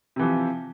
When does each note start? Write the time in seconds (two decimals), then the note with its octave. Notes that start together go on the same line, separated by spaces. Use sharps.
0.16 C3
0.19 E3
0.23 F3